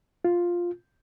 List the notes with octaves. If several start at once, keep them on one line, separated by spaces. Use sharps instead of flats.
F4